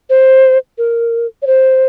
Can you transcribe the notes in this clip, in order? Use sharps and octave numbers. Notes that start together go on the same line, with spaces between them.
C5
A#4
C#5
C5